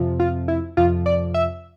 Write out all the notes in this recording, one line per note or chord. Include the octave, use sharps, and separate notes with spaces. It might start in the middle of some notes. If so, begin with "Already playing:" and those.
Already playing: F2 C3 F3
F4
E4
F2 C3 F3 F4
D5
E5